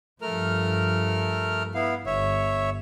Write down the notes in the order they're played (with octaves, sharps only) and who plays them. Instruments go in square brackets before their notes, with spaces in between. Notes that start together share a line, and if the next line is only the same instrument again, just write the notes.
[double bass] G2 F3 [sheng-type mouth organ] A3 A#4 F6
[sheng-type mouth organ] B3 E4 F5
[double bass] G1 [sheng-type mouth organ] C#5 E5